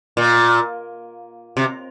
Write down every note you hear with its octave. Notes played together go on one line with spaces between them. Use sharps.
A#2
C3